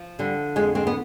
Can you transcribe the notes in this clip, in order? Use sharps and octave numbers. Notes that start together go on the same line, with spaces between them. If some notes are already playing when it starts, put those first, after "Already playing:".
Already playing: F3
D3 G3
F2 G#3
G#3 C4
B3